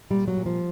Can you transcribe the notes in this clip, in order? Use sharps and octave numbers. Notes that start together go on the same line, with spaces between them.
A#2 G3
F#3
A#2
F3